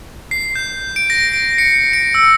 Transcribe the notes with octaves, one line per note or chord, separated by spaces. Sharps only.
C7
G6
D7
A#6
D7
C#7
D7
E6